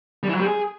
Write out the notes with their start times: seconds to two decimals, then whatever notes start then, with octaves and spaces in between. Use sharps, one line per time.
0.23 G3
0.29 E3
0.35 F#3
0.40 G3
0.46 G#4